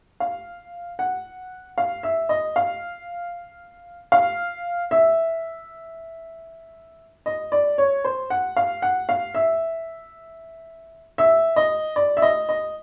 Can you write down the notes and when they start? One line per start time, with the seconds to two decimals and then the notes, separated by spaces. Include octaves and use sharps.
0.20 F5
0.99 F#5
1.78 F5
2.03 E5
2.29 D#5
2.56 F5
4.12 F5
4.91 E5
7.26 D#5
7.52 D5
7.78 C#5
8.04 C5
8.30 F#5
8.57 F5
8.82 F#5
9.09 F5
9.35 E5
11.18 E5
11.56 D#5
11.96 D5
12.17 E5
12.22 D#5
12.49 D#5